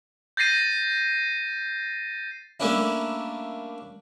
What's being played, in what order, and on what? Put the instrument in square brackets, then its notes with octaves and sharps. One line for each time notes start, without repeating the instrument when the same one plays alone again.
[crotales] G6 A6 A#6 C7 D#7
[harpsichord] G3 A3 A#3 C#4 D4 E4